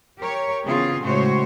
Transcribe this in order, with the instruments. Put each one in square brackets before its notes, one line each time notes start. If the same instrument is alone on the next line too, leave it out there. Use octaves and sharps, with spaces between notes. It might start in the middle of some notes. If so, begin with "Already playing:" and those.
[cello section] G4 A#4 C#5
C#3 E3 B3 C4 F4 G#4
A2 C#3 G#3 F#4 C5 C#5